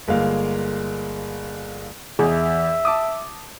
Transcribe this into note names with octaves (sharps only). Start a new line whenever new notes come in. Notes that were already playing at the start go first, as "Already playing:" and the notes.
G1 G#3 A#3 F5
E2 G#4 E5
A5 D6 D#6